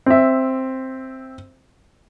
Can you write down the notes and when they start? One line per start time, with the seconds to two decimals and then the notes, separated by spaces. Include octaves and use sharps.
0.06 C4 E5